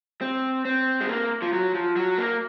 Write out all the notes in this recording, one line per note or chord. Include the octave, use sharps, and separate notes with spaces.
C4
C4
G#3
A#3
F3
F#3
F3
F#3
A#3